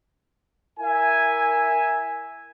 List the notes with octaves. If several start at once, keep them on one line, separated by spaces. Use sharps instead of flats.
E4 A#4 E5 G#5